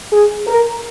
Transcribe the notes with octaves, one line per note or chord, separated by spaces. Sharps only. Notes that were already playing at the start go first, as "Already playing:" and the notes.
G#4
A#4